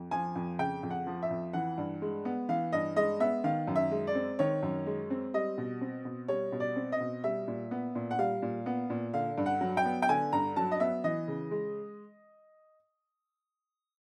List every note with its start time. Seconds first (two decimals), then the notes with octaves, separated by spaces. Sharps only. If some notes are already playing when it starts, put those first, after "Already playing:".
Already playing: F2
0.11 F3 G#5
0.35 F2
0.59 C#3 G5
0.83 F2
0.90 F#5
1.07 F3
1.22 E5
1.31 F2
1.53 E3 F#5
1.78 G2
2.02 G#3
2.25 B3
2.49 E3 F5
2.72 G2 D#5
2.96 G#3 D#5
3.20 B3 E5
3.44 D#3 F5
3.67 F#2
3.76 E5
3.91 G#3
4.07 D5
4.15 C4
4.39 D#3 C#5
4.63 F#2
4.86 G#3
5.10 C4
5.34 G3 D#5
5.58 B2
5.81 C4
6.05 B2
6.28 G3 C#5
6.52 B2
6.60 D5
6.76 C4
6.92 D#5
7.00 B2
7.24 G3 E5
7.48 A#2
7.71 B3
7.95 A#2
8.11 F#5
8.19 G3 F5
8.42 A#2
8.66 B3
8.90 A#2
9.14 D3 F5
9.38 G2
9.46 F#5
9.61 F#3
9.77 G5
9.85 B3
10.02 G5
10.09 D3 G#5
10.33 G2 A#5
10.56 F#3 A5
10.71 D#5
10.80 B3 E5
11.04 E3 D#5
11.28 C#3
11.51 G#3